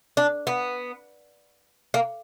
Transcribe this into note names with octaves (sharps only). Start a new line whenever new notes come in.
D4
B3
A#3